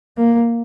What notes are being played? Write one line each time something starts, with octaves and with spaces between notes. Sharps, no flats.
A#3